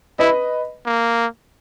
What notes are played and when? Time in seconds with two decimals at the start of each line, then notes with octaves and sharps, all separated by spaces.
0.19 E4 B4 D#5
0.86 A#3